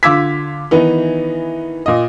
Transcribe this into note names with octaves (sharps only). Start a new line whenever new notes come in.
D3 F4 D6 E6 G#6 B6
D#3 E3 B3 D#4
A#2 D#5